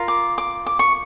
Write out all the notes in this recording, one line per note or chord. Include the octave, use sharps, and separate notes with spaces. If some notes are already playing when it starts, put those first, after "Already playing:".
Already playing: F4 A#4
D6
D6
D6
C#6